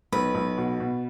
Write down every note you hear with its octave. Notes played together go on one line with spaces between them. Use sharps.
B1 B4
B1
B2
B2